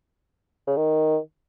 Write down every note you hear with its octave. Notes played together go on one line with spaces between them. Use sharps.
C#3
D#3